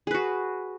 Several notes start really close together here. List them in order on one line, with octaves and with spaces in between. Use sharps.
G#4 B4 F#4